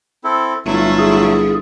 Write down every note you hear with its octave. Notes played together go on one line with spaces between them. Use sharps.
C4 E4 A4
G1 F#3 A3 E4 F4
G#4